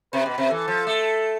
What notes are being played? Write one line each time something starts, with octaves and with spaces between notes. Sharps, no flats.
C3 B4
B2
C3
E3 A4
F3
A3